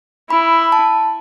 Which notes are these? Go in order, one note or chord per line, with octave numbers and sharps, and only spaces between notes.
E4 B5
A5